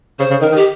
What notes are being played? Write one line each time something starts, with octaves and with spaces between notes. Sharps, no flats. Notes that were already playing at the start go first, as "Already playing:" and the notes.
C#3 C5
C#3
D#3 A#4
D#3
G4